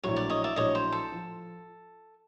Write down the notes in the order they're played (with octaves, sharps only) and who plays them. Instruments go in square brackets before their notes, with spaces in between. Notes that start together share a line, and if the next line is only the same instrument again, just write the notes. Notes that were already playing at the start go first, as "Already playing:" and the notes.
[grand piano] A#1 A2 F#3 [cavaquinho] C#5
[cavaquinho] D5
C#5 D#5
D5 E5
[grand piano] A#1 A2 F#3 [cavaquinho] C#5 D#5
[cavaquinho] C5
A4
[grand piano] F3